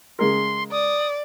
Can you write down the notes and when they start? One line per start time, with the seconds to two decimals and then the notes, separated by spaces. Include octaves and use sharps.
0.19 C#3 G#3 A#4 C6
0.72 D5 D#6